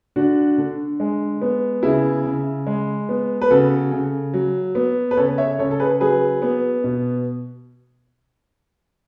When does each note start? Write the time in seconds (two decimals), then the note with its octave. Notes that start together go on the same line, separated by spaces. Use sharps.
0.16 D3 D4 F#4
0.58 D3
1.00 G#3
1.42 B3
1.83 C#3 E4 G#4
2.25 C#3
2.67 G#3
3.09 B3
3.41 B4
3.51 C#3 F#4 A4
3.92 C#3
4.34 F#3
4.75 B3
5.11 B4
5.17 C#3 A4 C#5
5.38 C#5 E5
5.59 C#3 A4 C#5
5.71 A4
5.80 G#4 B4
6.01 F#3 G#4 B4
6.42 B3
6.84 B2